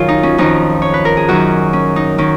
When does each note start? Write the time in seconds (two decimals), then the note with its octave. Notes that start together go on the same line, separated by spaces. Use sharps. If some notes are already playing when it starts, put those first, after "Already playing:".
Already playing: F#2 D#3 F4 G#4 A#4
0.08 D#4
0.23 C#4
0.38 F2 D#3 D#4
0.82 C#5
0.94 B4
1.05 A#4
1.17 G#4
1.28 F#2 D#3 F#4
1.73 C#4
1.96 D#4
2.18 D#3 C#4